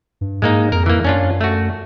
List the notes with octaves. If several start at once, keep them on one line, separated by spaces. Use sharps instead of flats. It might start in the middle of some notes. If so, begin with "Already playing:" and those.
G2
G#2 G#3 A#3 D#4
F2 A#4
E3 A#3
F#2 C#4 D4 F4
A3 F#4